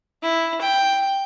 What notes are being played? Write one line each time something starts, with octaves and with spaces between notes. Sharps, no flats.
E4
G5